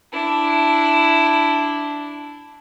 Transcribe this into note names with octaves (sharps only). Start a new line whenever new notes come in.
D4 E4